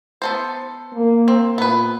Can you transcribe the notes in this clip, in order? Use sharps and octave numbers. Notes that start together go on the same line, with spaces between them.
B3 A4 C5
A#3
C4
A#2 B3 B4